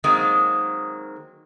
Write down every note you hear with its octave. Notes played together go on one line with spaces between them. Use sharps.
D#3 F#3 G#3 A#3 C4